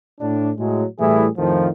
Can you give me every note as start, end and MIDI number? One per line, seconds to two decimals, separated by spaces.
0.21 0.50 45
0.21 0.50 62
0.58 0.84 45
0.58 0.84 54
0.58 0.84 56
1.00 1.27 45
1.00 1.27 52
1.00 1.27 55
1.00 1.27 57
1.00 1.27 64
1.00 1.27 68
1.37 1.68 41
1.37 1.68 45
1.37 1.68 51
1.37 1.68 53